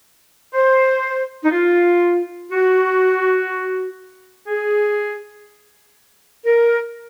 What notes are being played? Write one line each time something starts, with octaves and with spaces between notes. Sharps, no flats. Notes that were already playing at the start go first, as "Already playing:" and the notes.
C5
D#4
F4
F#4
G#4
A#4